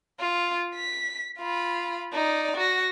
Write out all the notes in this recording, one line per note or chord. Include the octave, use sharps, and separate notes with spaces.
F4
B6
F4 B5
D#4 D5
F#4 A#6